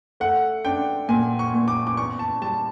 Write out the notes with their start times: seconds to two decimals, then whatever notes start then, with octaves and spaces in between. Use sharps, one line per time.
0.20 A3 F#5
0.65 D4 G5
1.09 A#2 G#5
1.39 C#6
1.54 A#2
1.68 D6
1.87 D6
1.97 E2 C#6
2.19 A5
2.42 G3 A5